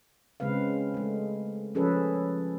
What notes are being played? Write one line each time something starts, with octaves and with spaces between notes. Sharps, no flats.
C#3 G#3 C4 B4 F5
G#3 A3
F3 C#4 G#4 A4 B4